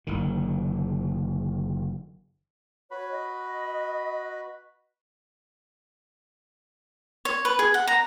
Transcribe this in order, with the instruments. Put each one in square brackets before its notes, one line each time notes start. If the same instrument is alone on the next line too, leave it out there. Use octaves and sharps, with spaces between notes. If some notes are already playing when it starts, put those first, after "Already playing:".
[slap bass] F#1 D3 D#3
[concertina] F#4 B4 B5 [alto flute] C#5
[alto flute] D#5
[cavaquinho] C#5
B4
G#4
F#5
A#5